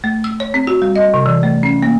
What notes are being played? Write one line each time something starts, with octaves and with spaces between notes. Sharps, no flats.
A3
E6
C#5
C4
F#4
G3
D#5
C3
E3
A3
C#4
A#3